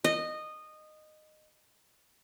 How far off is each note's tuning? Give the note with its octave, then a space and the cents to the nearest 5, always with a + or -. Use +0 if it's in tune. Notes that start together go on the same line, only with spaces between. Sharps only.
D#5 -15